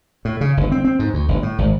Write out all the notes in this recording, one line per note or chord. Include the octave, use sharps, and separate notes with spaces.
A2
C#3
G1
C4
C4
G#2
D2
G1
A2
G#1